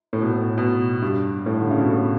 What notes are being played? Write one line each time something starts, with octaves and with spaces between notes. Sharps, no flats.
A2
B2
A2
B2
G2
A2
D3
C#3
B2
A2